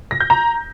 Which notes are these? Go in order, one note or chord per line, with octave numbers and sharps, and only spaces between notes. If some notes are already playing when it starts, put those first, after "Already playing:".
A#6
G6
A#5